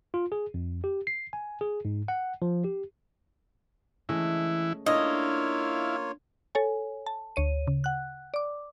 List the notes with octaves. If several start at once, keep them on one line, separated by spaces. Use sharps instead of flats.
F4
G#4
F2
G4
C7
G#5
G#4
G#2
F#5
F3
G4
E3 G#3 A3 C#4 E4
A#3 D4 E4 F4 A4 C#5 D#5 F5
A4 C#5 G#5
A5
D2 C#5 D#7
C#3
F#5 F#6
D5 D6